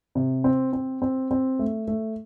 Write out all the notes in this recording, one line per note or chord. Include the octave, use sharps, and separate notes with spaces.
C3
C4
C4
C4
C4
A3
A3